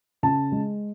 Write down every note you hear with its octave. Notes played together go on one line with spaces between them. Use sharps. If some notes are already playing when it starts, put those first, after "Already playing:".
C#3 A5
G#3